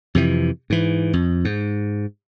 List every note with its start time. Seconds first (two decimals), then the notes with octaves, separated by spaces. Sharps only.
0.15 F2 C3 E3
0.70 G#2 E3
1.13 F2
1.45 G#2